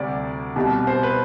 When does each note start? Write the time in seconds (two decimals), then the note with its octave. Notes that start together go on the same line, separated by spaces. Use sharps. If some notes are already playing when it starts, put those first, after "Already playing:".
Already playing: D2 C3 G3 D5
0.56 C2 B2 G3
0.87 C5
1.03 B4